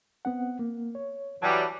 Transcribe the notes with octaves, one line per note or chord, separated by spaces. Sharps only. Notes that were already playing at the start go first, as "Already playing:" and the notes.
B3 C4 F#5
A#3
C#5
E3 F#3 G3 A5